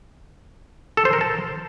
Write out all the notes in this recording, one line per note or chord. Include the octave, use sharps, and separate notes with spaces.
A4
C5
A#4
A5